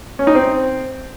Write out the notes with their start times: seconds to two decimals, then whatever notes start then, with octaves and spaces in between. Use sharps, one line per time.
0.19 C#4
0.27 D#4
0.35 C4